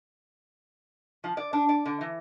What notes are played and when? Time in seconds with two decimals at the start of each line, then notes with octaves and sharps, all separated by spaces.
1.24 F3
1.37 D5
1.53 D4
1.69 D5
1.85 D3
2.01 E3